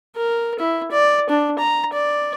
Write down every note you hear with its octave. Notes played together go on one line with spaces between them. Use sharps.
A#4
E4
D5
D4
A#5
D5